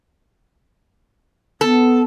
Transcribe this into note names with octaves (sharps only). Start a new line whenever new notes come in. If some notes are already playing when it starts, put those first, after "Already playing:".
B3 A4